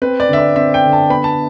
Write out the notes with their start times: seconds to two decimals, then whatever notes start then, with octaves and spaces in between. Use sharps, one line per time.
0.02 C4 B4
0.20 D5
0.29 D3 E5
0.38 D5
0.56 C4 E5
0.74 G5
0.84 D3
0.93 A5
1.10 B3 B5
1.24 A5